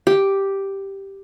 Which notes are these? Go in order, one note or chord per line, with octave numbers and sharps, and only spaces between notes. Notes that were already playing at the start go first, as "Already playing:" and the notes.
G4